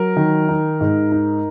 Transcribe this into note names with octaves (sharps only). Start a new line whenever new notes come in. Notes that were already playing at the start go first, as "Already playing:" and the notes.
Already playing: F#3 A#4
D#3
D#4
G#2
D#4